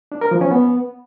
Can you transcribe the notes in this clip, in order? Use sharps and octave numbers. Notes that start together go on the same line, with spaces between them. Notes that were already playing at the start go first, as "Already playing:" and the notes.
D4
A#4
F3
C#4
B3